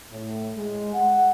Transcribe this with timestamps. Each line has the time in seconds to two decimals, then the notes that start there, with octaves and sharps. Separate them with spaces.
0.11 A2
0.56 G#3
0.94 F#5